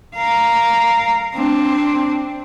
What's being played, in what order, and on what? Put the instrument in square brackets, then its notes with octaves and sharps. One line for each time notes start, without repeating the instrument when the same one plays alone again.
[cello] A#4 F5
C4 D4